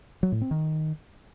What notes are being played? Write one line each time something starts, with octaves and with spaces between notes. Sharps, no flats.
F#3
A2
C4
D#3